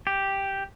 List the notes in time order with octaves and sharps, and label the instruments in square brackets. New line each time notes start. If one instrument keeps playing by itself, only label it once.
[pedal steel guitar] G4